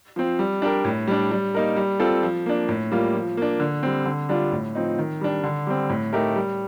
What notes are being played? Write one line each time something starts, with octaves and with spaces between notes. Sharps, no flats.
F3 C4
G3
D4 G4 A#4
A2
G3 D4
G3
A#3 D#4 A#4
G3
C4 F4 A4
F3
A#3 D4
A2
G3 A#3 F4
F3
A#3 D4
D3
G3 C4
D3
G3 D4 F4
A2
F3 C4 D#4
D#3
G3 D4
D3
G3 C4
A2
A3 D#4 G4 A#4
G3